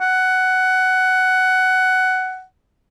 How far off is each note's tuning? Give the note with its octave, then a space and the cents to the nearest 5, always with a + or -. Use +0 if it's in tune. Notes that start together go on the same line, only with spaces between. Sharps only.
F#5 +10